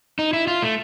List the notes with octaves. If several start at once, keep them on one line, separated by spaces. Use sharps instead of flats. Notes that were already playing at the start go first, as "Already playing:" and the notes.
D#4
E4
F4
A3